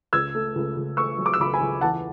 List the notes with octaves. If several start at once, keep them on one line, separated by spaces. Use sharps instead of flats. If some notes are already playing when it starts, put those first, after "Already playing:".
C#2 E6 G#6
A3
C#2
C#2
A3 C#6 E6
F#3
D6
E6
C#2 B5 D6
G#5 B5
C#2
E2 F#5 A5